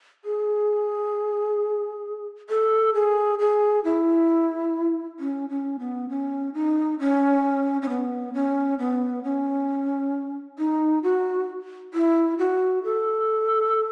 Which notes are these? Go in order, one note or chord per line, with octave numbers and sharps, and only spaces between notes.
G#4
A4
G#4
G#4
E4
C#4
C#4
B3
C#4
D#4
C#4
C#4
B3
C#4
B3
C#4
D#4
F#4
E4
F#4
A4